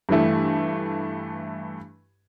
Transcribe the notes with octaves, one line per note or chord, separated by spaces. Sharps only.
G2 E3 A3